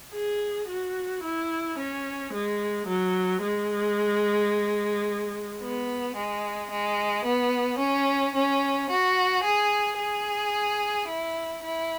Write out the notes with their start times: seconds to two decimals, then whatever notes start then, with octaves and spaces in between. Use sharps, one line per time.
0.13 G#4
0.67 F#4
1.22 E4
1.77 C#4
2.31 G#3
2.86 F#3
3.42 G#3
5.61 B3
6.16 G#3
6.70 G#3
7.25 B3
7.80 C#4
8.35 C#4
8.89 F#4
9.43 G#4
9.98 G#4
11.08 E4
11.63 E4